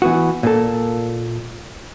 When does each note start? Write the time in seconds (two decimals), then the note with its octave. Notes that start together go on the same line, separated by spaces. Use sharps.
0.02 E3 B3 F#4
0.43 A#2 A#3 A4